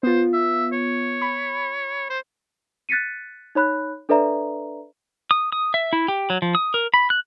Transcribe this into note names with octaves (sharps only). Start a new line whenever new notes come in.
B3 F4 C5
E5
C#5
B5
C5
F#6 A6 B6 C#7 D#7
D#4 C#5 B5 F#6
D4 A4 B4 D5 E5 A#5
D#6
D#6
E5
E4
G4
F#3
F3
D#6
A#4
B5
F#6